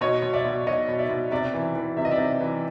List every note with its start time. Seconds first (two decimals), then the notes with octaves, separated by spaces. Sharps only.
0.01 B2 C#5 D#5
0.22 B2
0.33 D5 E5
0.45 B2
0.67 B2 C#5 D#5
0.89 B2
0.99 D5 E5
1.09 B2
1.31 C3 D5 E5
1.54 E3
1.75 E3
1.97 C3 E5
2.05 D#5
2.11 D5 E5
2.18 C3
2.41 E3